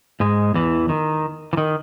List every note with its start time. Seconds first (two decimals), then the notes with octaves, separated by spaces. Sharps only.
0.20 G#2 G#3
0.54 E2 E3
0.89 D#3
1.53 E3
1.57 D#3